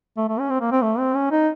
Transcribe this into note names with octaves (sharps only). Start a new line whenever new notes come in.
A3
A3
C#4
C4
A#3
C4
A3
C4
C#4
D#4